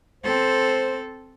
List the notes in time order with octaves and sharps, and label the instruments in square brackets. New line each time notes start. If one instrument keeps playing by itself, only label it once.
[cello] C4 A4 [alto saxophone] C5